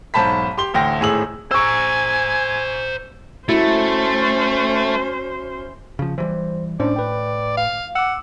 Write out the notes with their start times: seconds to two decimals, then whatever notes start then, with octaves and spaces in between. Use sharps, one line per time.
0.14 B1 G#2 C5 A5 B5 B6
0.58 G4 C6 G7
0.74 A1 D2 G5 A#6
1.00 G#1 A2 G#4 E6 F#7
1.51 C5 G#5 A#5 C#6 E6
3.49 A3 C#4 E4 F#4 C5
5.99 C#3 F3
6.18 E3 F#3 G3 C5
6.80 A2 C#4 D4 C5 D5
6.96 B4 G5
7.58 F5
7.95 F#5 D6 E6